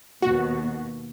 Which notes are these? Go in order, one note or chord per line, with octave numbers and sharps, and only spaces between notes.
D#2 B2 F#4